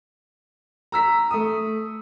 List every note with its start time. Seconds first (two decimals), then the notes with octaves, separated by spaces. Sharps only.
0.92 A#5 E6 B6
1.31 A3 D#6